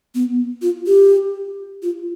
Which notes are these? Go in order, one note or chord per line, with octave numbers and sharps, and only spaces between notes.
B3
F4
G4
F4